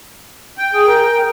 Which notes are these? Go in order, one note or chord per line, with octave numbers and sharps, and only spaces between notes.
G5
G#4
A#4
A#4